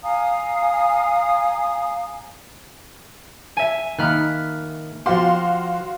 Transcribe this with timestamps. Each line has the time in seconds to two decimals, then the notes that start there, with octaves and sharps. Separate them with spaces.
0.03 F5 G#5 A#5 D#6
3.57 E5 G#5
3.99 D#3 A#3 D#4 B5 F6 F#6
5.06 F3 F#4 G4 F5 C6